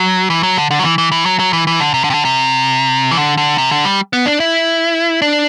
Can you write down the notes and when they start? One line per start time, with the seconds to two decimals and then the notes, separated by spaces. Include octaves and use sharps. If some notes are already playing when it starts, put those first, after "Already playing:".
Already playing: F#3
0.30 E3
0.43 F#3
0.57 D3
0.71 D3
0.79 F#3
0.84 E3
0.98 E3
1.12 E3
1.25 F#3
1.39 F#3
1.53 E3
1.67 E3
1.80 D3
1.94 C3
2.04 D3
2.10 C3
2.14 D3
2.25 C3
3.11 E3
3.17 D3
3.37 D3
3.58 C3
3.71 D3
3.85 G3
4.13 B3
4.26 D4
4.40 E4
5.22 D4